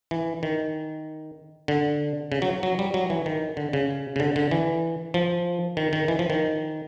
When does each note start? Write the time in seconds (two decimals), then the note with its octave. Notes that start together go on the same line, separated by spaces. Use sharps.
0.11 E3
0.43 D#3
1.68 D3
2.32 C#3
2.42 F#3
2.63 F#3
2.79 G3
2.94 F#3
3.10 E3
3.26 D#3
3.57 D3
3.73 C#3
4.16 C#3
4.20 D3
4.36 D3
4.51 E3
5.14 F3
5.77 D#3
5.93 D#3
6.08 E3
6.19 F3
6.30 D#3